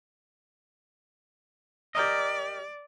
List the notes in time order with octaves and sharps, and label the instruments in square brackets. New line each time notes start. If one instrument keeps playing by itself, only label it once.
[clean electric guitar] G4 A#4 D#5 [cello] D5